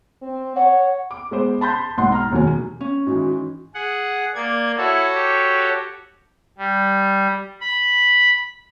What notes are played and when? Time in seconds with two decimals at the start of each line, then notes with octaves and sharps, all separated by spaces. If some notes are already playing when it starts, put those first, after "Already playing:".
0.22 C4
0.56 C#5 F#5
1.11 D6
1.31 G#3 B3 C5
1.61 A5 B5 C6 G6 A6
1.98 B1 G#2 F#5 C6
2.12 A#5 F6
2.31 E1 D#2 F#3 G#5
2.80 C#4
3.07 G#2 D#3 E3 F#4
3.75 G#4 F#5
4.35 A#3 D5 G#6
4.78 E4 F#4 A4 C#5
5.14 G4
6.58 G3
7.61 B5